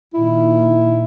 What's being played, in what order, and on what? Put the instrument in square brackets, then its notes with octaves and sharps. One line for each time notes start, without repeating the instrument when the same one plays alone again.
[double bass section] A#2 D#3 [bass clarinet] E4